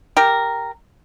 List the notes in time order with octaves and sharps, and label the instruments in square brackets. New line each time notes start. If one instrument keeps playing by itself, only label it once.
[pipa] G4 A#4